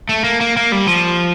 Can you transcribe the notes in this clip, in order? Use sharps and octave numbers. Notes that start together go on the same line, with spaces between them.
A3
A#3
A#3
A#3
G3
F3